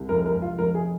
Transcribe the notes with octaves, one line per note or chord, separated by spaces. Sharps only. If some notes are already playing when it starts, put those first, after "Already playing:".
Already playing: C2
F1 A#4
A#4
F1
F4
F1 A#4
G#4